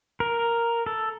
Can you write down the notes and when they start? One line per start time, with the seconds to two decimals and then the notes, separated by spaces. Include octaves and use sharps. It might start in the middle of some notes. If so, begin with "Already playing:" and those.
0.20 A#4
0.86 A4